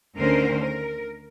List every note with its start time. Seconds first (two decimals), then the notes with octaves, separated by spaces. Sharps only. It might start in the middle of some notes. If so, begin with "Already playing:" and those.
0.18 D2 D3 D#3 C#4 A#4 C5
0.60 A#4